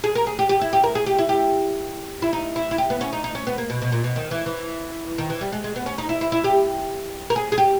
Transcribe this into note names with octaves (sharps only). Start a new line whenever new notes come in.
G#4
A#4
G#4
G4
G4
E4
G4
A#4
G#4
G4
E4
G4
E4
D#4
E4
E4
G4
B3
C#4
D#4
D#4
C#4
B3
A#3
B2
B2
A#2
B2
D#3
E3
E3
D#3
E3
G3
G#3
G#3
B3
C#4
D#4
E4
E4
E4
G4
A#4
G#4
G#4
G4